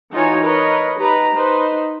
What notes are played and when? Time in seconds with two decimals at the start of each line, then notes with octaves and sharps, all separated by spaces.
0.12 E3 D#4 F4 F#4 C#5 G#5
0.43 A#4 B4 C#5 D#5
0.97 D#4 G4 B4 A#5
1.33 D#4 B4 C5